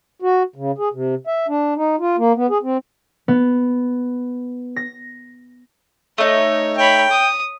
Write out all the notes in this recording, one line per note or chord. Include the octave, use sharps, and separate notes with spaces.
F#4
C#3
G#4
C3
E5
D4
D#4
F4
A#3
B3
G#4
C4
B3
A#6
A3 D#4 C#5
C#5 G5 B5
D#6